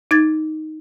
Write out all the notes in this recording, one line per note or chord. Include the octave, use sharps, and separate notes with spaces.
D#4 G#6 A6